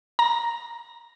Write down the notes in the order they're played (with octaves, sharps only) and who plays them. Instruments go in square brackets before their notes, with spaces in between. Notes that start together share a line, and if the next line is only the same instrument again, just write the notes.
[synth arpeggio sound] A#5